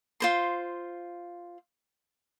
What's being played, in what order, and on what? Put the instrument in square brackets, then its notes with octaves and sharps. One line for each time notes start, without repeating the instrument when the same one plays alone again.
[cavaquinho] F4 C5 C6